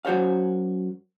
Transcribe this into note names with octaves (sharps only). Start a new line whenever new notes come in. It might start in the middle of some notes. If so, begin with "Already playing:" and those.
F#2 F#4 C5 C#5 F5